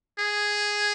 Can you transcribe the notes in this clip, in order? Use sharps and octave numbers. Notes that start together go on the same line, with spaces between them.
G#4